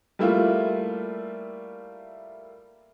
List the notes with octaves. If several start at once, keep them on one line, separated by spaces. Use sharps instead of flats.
G3 A3 A#3 E4 F4